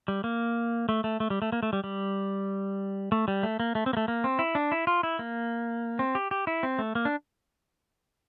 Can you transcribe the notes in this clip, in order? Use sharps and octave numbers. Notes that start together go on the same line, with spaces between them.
G3
A#3
A3
A3
A3
G3
A3
A#3
A3
G3
G3
A3
G3
A3
A#3
A3
C4
A#3
A3
A#3
C4
E4
D4
E4
F4
E4
A#3
C4
G4
G4
E4
C4
A3
A#3
D4